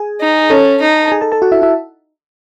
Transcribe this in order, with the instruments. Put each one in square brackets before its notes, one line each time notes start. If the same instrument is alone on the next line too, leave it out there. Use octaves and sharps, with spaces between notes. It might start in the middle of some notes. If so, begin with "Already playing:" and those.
Already playing: [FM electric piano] G#4 G#5
[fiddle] D#4
[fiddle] C#4 [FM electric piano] A4 A5
[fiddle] D#4
[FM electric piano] A5
G#4 G#5
A4 A5
A4 A5
F#4 F#5
E4 E5
E4 E5